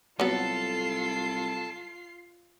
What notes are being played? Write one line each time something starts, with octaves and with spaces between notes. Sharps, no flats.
C2 F#3 B3 F4 A4 C7